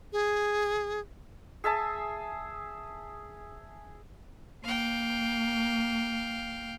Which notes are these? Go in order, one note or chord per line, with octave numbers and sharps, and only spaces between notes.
G#4
G#4 E5 A5 D#6
A#3 F5 G5